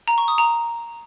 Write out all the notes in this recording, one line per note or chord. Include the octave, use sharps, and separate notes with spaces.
A#5
C#6
D#6
A#5